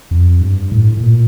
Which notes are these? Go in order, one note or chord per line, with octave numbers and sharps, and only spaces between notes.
F2
G2
A2
A2
A#2